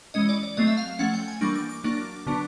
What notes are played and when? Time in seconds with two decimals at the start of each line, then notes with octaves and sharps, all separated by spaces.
0.14 E3 G#3 C#4 D#5
0.29 D5
0.43 D5
0.57 F#3 A3 C4 D#5
0.67 E5
0.77 F5
0.88 F5
0.99 F3 A3 C#4 F#5
1.14 G5
1.28 G#5
1.41 E3 G3 A#3 D4 C#6
1.55 D6
1.69 D6
1.84 F#3 A#3 D4
2.27 D3 F#3 B3 D4